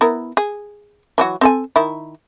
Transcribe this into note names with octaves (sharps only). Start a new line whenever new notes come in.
B3 E4 A#4
G#4
E3 F#3 F#4
C4 A4 G#5
D#3 E4